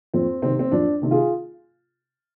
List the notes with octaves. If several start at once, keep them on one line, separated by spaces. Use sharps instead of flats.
F2 C4
C3 D#3 C4
C4
F2 D4
C3 D#3
F4 G#4